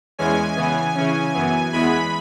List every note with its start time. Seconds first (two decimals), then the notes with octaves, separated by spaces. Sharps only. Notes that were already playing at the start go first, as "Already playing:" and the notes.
0.19 E2 E3 G#3 C#4 G#5
0.57 C#3 E3 B3
0.95 C#3 E3 C#4
1.34 F#2 E3 B3
1.72 E2 E3 G#3 B3 B5